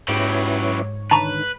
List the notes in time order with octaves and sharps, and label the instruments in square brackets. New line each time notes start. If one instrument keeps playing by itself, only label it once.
[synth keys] G#2 C#5 [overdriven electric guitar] F#3 G4 [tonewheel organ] C#4 E4 B4
[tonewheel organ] D3 D#3 [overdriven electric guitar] B4 [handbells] A5 A#5 C#6